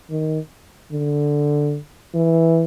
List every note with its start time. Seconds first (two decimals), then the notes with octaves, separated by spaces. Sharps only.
0.10 D#3
0.92 D3
2.15 E3